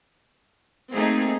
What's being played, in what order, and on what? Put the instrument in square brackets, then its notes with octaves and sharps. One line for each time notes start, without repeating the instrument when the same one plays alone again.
[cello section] A3 A#3 G#4 [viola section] C4 D#4